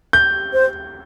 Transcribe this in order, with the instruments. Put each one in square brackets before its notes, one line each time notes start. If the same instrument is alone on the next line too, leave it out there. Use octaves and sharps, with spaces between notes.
[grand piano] G6
[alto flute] C5